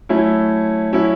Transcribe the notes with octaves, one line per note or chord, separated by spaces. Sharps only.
F#3 A3 C#4 E4
F#3 C#4 E4